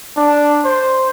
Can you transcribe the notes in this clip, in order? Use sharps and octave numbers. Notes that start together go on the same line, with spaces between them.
D4
C5